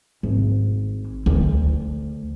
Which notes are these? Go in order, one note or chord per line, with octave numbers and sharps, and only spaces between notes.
G#1
D2